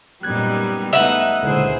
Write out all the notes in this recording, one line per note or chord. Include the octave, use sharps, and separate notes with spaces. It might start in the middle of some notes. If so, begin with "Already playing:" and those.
F#2 A#2 G3 B3 D#4 F#6 G#6
E2 A3 B3 D#4 B4 E5 F#5
C#2 A#2 D3 E3 E4 G#4 C5